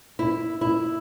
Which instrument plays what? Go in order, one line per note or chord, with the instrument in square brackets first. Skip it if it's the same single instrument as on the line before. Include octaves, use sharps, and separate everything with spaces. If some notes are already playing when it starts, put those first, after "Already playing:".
[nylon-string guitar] E4
E4